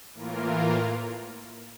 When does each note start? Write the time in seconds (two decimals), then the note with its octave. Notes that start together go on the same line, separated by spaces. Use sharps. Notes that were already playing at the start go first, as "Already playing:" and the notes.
0.13 A2 E3 A#3 F4 A#4